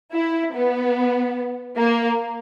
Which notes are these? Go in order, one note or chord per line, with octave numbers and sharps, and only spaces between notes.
E4
B3
A#3